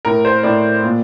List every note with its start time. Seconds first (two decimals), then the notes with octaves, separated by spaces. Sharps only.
0.05 A2 A#4
0.25 C5
0.43 A2 D5
0.83 A#2